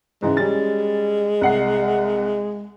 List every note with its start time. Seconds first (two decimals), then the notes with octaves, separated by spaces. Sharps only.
0.22 G#2 C#3 E3 G#3
0.37 G3 C#4 A6
1.41 C2 F#5 C7